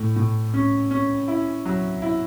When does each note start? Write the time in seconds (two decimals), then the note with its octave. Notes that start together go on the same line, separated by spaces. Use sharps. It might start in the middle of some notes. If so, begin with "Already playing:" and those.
Already playing: A2
0.16 A2
0.54 C#4
0.91 C#4
1.28 E4
1.65 F#3
2.02 E4